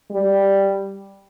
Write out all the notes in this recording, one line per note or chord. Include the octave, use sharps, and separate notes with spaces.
G3